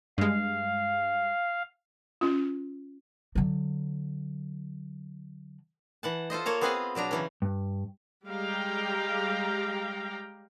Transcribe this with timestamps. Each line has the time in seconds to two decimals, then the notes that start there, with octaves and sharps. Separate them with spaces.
0.18 G2 G#3 F5
2.21 C#4 F4
3.35 D3 F#3
6.03 E3 F#5 A5
6.30 F4 A4 C5 D#5
6.46 A#3 C#5 A5 A#5
6.61 B3 C4 G#4 B4 D#5 F5
6.95 B2 F#3 D4 A#5
7.11 C#3 E3 C#4
7.42 G2
8.27 G3 G#3 G4 F5 G5 A#5